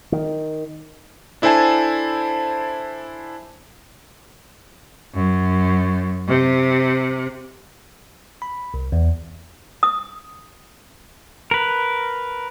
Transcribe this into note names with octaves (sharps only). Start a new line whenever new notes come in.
D#3
D4 E4 A4 C5 G#5 A5
F#2
C3
B5
C2
E2
D#6
A#4 B4